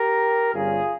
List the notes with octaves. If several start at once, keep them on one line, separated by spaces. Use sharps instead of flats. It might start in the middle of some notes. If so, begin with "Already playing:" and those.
Already playing: G4 A#4
G1 G2 G3 C#4 F4 G#4